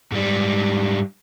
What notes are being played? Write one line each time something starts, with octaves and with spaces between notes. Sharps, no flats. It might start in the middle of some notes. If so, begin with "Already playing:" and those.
G#2 G3